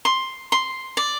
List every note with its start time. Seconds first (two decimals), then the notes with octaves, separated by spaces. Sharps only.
0.05 C6
0.52 C6
0.97 D5